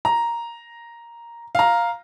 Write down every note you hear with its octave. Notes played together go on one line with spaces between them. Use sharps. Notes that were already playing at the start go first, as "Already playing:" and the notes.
A#5
F5 A#5